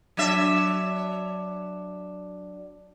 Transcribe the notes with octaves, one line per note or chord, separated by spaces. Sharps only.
F#3 D4 E5